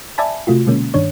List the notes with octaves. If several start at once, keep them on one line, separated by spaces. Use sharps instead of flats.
D5 E5 G#5 A5 B5
C3 A3 F4 F#4
B2 D3 G#3 A#3 C#4
G2 D#3 D4 C#5